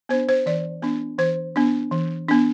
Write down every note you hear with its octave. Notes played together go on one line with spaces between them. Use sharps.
B3 D4 C5
C5
E3 D5
B3 D4
E3 C5
B3 D4
E3
B3 D4